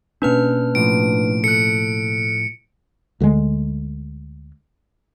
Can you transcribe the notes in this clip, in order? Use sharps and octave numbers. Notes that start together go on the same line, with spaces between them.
B2 A#3 C#4 D4 B4 F6
A2 F3 D7
A4 F#6 C#7
D2 D3 E3 G#3